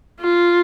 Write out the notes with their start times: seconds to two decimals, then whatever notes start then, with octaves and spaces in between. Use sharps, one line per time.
0.21 F4